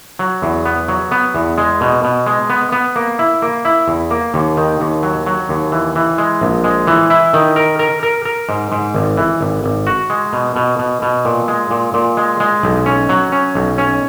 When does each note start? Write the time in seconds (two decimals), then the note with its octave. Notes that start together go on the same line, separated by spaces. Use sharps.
0.19 F#3
0.42 E2
0.66 B3
0.88 F#3
1.11 B3
1.35 E2
1.58 G#3
1.81 B2
2.04 B2
2.27 G#3
2.50 B3
2.72 B3
2.96 A#3
3.19 E4
3.42 A#3
3.65 E4
3.88 E2
4.11 A#3
4.34 D#2
4.57 D#3
4.80 D#2
5.03 F#3
5.26 F#3
5.49 D#2
5.72 E3
5.95 E3
6.18 G#3
6.41 A#1
6.64 G#3
6.87 E3
7.10 E4
7.34 D#3
7.56 A#4
7.79 A#4
8.03 A#4
8.25 A#4
8.49 G#2
8.72 G#2
8.95 G#1
9.18 E3
9.41 G#1
9.64 G#1
9.87 F#4
10.10 G#3
10.33 B2
10.56 B2
10.79 B2
11.02 B2
11.25 A#2
11.48 G#3
11.71 A#2
11.94 A#2
12.17 G#3
12.40 G#3
12.63 B1
12.86 C#4
13.09 F#3
13.32 C#4
13.55 B1
13.78 C#4